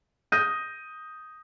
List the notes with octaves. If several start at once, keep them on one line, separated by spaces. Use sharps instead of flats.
D#6 G6 A#6 D#7